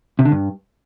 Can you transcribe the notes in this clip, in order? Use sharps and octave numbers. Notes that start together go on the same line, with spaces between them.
C3
D3
G2